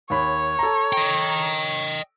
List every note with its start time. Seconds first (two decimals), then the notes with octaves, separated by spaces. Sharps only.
0.10 D#2 C#5 B5
0.59 A4 A#5
0.93 D#5 G5